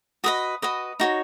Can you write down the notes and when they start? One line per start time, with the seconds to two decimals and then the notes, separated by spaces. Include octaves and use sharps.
0.24 F#4 B4 D#5 D#6
0.62 F#4 B4 D#5
1.00 D#4 F#4 C#5